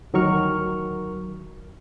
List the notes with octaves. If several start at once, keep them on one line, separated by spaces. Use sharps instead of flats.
D2 D#3 F#3 A#4 C#6 F6